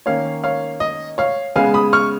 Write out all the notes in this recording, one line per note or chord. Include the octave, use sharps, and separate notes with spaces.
D#3 A#3 C#4 C#5 F5
C#5 F5
D#5
C#5 F5
C#3 G#3 B3 F5 G#5
B5 D#6
C#6 F6